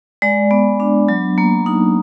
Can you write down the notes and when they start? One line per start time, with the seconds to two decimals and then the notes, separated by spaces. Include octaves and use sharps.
0.22 G#3 D5
0.51 B3
0.80 D4
1.09 F#3
1.38 A#3
1.66 D#4